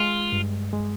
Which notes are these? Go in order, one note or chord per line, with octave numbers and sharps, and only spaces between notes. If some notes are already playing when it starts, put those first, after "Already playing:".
Already playing: G#3 F4
G2
G#3